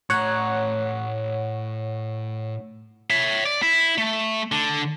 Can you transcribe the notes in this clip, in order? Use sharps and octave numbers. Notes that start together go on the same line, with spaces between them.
A2 C#5 F#5 A#5
C#5 E5
D5
E4
A3
D3